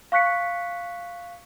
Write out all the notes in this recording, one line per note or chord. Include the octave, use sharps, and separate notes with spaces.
F5 C#6 F#6 B6 C#7